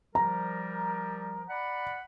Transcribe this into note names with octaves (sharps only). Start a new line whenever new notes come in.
F3 G3 A#4 A#5
D5 F#5 B5